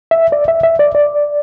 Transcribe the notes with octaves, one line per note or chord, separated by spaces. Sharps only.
E5
D5
E5
E5
D5
D5